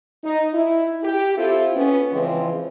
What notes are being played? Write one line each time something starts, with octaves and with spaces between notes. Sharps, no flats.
D#4
E4
G4
C4 E4 F4 A4
B3 C#4
C#3 E3 F3 G#3 C4